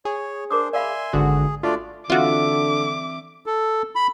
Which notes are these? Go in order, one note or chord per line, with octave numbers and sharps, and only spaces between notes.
G#4 C#5
D4 A#4 C5 D6 D#6
D5 E5 F5 G#5 B5 C6
G#1 D3 F#4 G#4
A3 D4 F4 F#4 D5
D3 E3 C4 F4 F#4 E5 D6
A4
B5